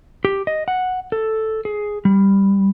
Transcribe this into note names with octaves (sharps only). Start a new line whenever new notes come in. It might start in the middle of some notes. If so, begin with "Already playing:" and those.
G4
D#5
F#5
A4
G#4
G3